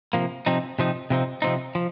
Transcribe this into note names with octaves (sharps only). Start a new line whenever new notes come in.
C3 F3 A#3
C3 F3 C4 D#4
C3 F3 C4 D#4
C3 F3 C4 D#4
C3 F3 C4 D#4
F3